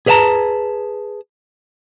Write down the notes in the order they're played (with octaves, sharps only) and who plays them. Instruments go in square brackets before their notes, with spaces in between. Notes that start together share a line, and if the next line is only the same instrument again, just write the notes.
[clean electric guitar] G#4 B4 C#5 F5 A5 A#5